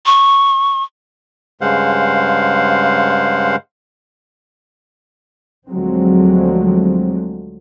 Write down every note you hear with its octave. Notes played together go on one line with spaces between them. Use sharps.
C#6
G2 C#3 G#3 C5 F5 F#5
D2 D3 F3 F#3 G#3 C4